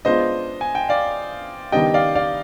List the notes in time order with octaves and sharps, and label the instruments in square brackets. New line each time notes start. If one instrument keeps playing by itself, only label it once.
[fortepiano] G#3 B3 D4 F4 [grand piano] C5 D#5
[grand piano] G#5
G5
D5 F5
[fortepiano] D#3 G3 B3 D4 G4 [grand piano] D#5 G5
[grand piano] D5 F5
D5 F5